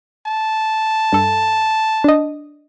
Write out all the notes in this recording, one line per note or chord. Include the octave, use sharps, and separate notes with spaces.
A5
G2 A4
D4 D#5